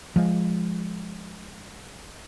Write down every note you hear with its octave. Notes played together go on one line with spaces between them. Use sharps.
F3 G#3